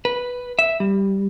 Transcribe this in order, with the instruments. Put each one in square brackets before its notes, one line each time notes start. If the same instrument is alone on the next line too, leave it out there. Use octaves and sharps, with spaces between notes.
[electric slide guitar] B4
E5
G3